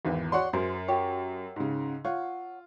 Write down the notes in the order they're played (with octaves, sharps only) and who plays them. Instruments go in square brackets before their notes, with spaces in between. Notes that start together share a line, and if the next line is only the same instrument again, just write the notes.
[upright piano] G#1 E2 E3
[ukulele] F#4 C#5 D5 [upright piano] F#5 C6
[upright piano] F#2 [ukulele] G#4 A#4 C5
[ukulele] F#4 G4 C#5
[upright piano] G#2 C#3
[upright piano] F4 [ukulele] C#5 F#5